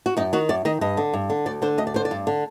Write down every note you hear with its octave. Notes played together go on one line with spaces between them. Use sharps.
F#4
F#2 D#4
D#3 F#4
F#2 D5
D#3 D#5
G2 D#5
D3
G2
D3
D2 D5
D3 C5
D2 D#5
D5
D3 C5
D5
G2
D3